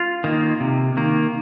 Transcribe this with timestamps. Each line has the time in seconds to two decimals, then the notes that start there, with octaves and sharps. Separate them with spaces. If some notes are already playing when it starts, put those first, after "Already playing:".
Already playing: F4
0.24 D#3 A#3
0.60 C3
0.97 D#3 A#3